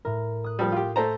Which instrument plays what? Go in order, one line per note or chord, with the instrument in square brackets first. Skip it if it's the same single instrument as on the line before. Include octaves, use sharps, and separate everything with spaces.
[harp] A2 A#4
D#6 F#6
[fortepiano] F3 G3
F4 G4
[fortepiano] A3 C5 A#5 [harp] A5